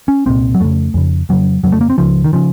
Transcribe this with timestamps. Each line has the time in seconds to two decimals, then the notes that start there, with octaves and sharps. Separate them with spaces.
0.08 C#4
0.26 C2 A#2 C4
0.55 F#3
0.60 F2 C#3 A3
0.94 F2 C#3
1.29 F2 C#3 F#3
1.63 F2 C#3 F#3
1.72 A3
1.81 A#3
1.90 C4
1.98 C#2 C#3 F3
2.24 D#3
2.33 C#3 F3